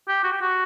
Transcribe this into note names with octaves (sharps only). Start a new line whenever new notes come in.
G4
F#4
G4
F#4